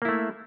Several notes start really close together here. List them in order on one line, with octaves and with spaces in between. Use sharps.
A#3 E4 A3